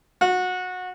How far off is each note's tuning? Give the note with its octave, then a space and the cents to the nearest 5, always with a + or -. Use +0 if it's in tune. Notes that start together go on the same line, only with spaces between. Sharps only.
F#4 -20